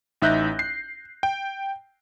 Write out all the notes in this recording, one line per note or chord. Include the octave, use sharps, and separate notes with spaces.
A1 D#4 E5 F#6 G6 A#6
C7
G5